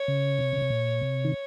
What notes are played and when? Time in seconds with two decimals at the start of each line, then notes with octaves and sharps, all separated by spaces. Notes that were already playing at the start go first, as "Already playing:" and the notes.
Already playing: C#5
0.08 C#3
0.39 C3
0.53 C#3
0.62 C3
0.70 A#2
1.01 C3
1.25 D#3